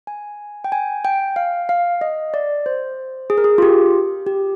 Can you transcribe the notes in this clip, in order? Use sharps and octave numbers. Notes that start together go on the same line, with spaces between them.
G#5
G5
G#5
G5
F5
F5
D#5
D5
C5
G#4
A#4
G#4
F4
G4
G4